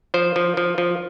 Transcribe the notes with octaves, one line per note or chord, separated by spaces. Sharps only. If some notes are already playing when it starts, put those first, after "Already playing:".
F3 C5
F3
F3
F3